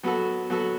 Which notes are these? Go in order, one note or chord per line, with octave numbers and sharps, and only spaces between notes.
F#3 B3 F#4 A4
F#3 B3 F#4 A4